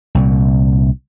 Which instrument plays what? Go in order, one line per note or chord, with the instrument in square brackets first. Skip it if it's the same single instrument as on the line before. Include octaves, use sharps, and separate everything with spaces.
[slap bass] C2 A#2